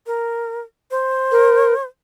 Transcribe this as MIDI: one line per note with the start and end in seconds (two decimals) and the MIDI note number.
0.07 0.61 70
0.91 1.85 72
1.32 1.74 70